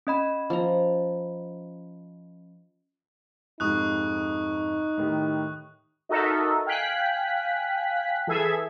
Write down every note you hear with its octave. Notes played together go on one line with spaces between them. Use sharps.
C#4 D#5 B5
F3 A#5
F2 G#2 C3 D#4 C#6 D#6 F#6
A2 D#3 G4
D#4 F#4 A4 A#4 D#5 E5
F5 G5 G#5 F#6 B6
E3 G#4 A4 E5 G#6